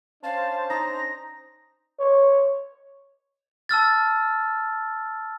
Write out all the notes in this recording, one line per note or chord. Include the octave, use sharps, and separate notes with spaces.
C#4 D4 C5 F5 A5
D#4 A#6
C#5
A5 E6 F6 A6